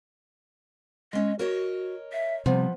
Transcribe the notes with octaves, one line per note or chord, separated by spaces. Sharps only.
G#3 C#4 D#5
F#4 A#4 C#5 D#5
E5
C3 F3 G3 B3